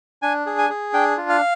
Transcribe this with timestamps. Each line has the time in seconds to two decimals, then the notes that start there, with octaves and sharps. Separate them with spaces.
0.22 D4 G#5
0.46 G#4
0.58 G#5
0.70 G#4
0.93 D4 G5
1.17 F4
1.29 F5